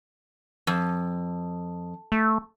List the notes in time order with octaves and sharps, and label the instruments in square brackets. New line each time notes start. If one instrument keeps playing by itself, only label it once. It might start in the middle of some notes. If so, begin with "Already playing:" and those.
[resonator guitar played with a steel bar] F2
[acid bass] A3